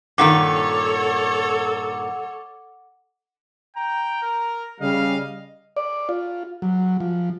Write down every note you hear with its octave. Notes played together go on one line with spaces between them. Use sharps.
G2 A#2 D#3 A4 C#5 F#5 D6
G5 A#5
A#4
C#3 G3 D#5 F5
D5
F4
F#3
F3